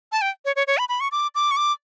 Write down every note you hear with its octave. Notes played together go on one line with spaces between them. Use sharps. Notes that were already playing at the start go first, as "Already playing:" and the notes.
A5
G5
C#5
C#5
C#5
B5
B5
C#6
D6
D6
C#6
D6